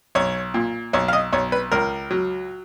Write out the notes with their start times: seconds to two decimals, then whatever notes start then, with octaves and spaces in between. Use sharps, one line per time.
0.15 B1 C#5
0.54 A#2
0.93 B1 C#5
1.08 F5
1.13 D#5
1.33 B1 C#5
1.52 B4
1.72 C#2 A#4
2.11 F#3